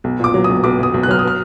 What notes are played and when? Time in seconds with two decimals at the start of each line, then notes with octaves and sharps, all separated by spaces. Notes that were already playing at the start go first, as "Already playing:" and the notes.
0.04 B1
0.20 A#2 D6
0.34 F#3
0.44 B1 D#6
0.64 B1 D6
0.79 B1 D#6
0.94 B1
1.03 F#6
1.08 F#3 F6
1.19 D#6
1.28 F6